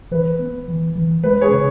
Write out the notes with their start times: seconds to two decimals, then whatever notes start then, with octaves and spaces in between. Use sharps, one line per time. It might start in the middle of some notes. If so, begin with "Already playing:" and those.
0.11 E3 B4
0.39 B3
0.68 E3
0.95 E3
1.23 G#3 B4
1.41 G#4 C#5
1.52 C#3